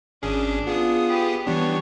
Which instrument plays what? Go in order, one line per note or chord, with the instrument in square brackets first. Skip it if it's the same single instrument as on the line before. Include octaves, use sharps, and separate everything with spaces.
[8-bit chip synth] G#1 C#4 G#4 [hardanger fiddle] D4
[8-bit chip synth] B3 G#4 D#6 [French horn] F4
[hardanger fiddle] G4 B4
[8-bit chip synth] E3 B3 D4 [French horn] G3 [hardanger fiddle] C#5